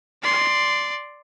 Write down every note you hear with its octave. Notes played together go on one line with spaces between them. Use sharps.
D5 C6